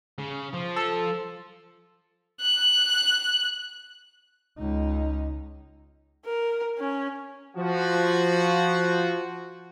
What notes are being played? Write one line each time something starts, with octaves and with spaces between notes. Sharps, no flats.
C#3
F3
A4
F#6
C#2 D#4
A#4
C#4
F3 F#4